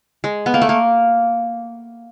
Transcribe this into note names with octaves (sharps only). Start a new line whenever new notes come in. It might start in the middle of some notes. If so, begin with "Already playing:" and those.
G#3
B3
A#3
A3
A#3